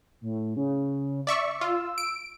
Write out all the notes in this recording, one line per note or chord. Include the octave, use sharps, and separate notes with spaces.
A2
C#3
D5 E5 C#6
F4 E6
D7